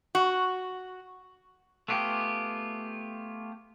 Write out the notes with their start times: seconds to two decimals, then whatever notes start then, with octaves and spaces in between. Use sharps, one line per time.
0.15 F#4
1.88 A3 B3 F4 G4 G#4